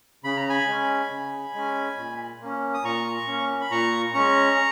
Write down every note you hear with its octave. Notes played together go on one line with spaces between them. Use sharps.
C#3 B5
A#5
G#5 B5
G#3 C#4
C#3
G#3 C#4
A#2
A#3 C#4
D#6
A#2 A#5 C#6
A#3 C#4
B5
A#2 A#5 C#6
G#3 C#4 A#5 C#6